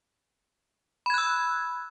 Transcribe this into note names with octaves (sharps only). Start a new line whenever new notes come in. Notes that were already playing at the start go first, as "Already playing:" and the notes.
B5 E6 F#6 G#6